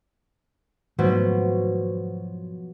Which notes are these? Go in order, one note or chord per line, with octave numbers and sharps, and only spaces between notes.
G#2 B2 D#3 F3 F#3 A3